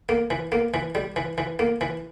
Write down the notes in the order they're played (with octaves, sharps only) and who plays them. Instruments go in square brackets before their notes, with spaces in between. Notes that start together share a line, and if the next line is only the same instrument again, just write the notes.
[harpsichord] A#3
E3
A#3
E3
G3
E3
E3
A#3
E3